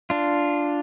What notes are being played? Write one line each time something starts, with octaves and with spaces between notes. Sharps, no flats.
D4 F4